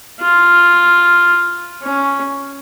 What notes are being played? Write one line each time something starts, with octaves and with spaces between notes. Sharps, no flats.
F4
C#4